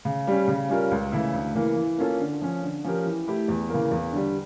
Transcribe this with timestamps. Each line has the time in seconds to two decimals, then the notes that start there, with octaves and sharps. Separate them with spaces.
0.05 C#3
0.27 G3 C#4
0.48 C#3
0.69 G3 C#4 F4 A#4
0.91 C#2
1.12 C#3 E3 A3 E4
1.33 D2
1.55 C#3 E3 A#3
1.76 E3
1.98 A#3 C#4 F4 A4
2.20 D3
2.41 F3 C#4
2.62 D3
2.84 F3 C#4 G4 A#4
3.06 E3
3.28 A3 E4 G4
3.48 E2
3.70 C#3 E3 A#3
3.91 E2
4.12 D3 G3